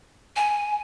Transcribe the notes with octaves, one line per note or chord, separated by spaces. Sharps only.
G#5